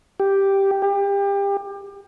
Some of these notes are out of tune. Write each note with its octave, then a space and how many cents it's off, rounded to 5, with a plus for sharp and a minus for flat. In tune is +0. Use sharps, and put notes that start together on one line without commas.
G4 +0
G4 +30